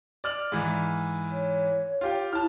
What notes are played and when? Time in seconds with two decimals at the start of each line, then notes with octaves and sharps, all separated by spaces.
0.24 D5 F6 F#7
0.52 G#2 E3
1.32 C#5
2.01 F4 G4 G5
2.33 E4 A5 F6